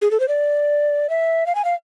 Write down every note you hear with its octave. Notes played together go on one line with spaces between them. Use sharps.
G#4
A4
C5
D5
E5
F5
G#5
F5